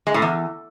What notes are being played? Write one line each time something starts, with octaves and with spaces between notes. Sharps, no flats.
G#3
A2
E2